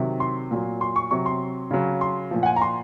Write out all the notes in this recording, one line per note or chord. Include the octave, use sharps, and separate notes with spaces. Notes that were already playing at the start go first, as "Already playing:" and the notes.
Already playing: C3 D#3 F#3
C6
A#2 F#3
C6
C#6
C3 F#3 C#6
C6
C#3 F#3
C6
A#2 F3
F#5
G#5
A#5
C6